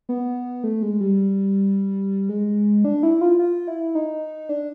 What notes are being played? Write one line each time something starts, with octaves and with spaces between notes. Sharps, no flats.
B3
A3
G#3
G3
G#3
D4
E4
F4
F4
E4
D#4
D4